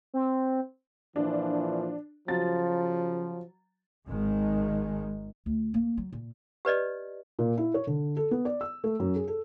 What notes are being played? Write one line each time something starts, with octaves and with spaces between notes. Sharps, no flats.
C4
A#2 E3 F3 D4
C#3 F3 F#3 A6
G#1 D#3 G#3
D2
A#3
F#3
A#2
G4 B4 D5 D#5
A#2
E4
C#5
D3
A4
B3
D5
E6
A3
F#2
G#4
A4